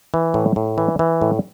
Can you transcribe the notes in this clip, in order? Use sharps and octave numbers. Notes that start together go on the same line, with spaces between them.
E3
A2
A2
E3
E3
A2